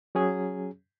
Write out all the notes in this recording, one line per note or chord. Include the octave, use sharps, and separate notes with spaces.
F#3 C#4 G#4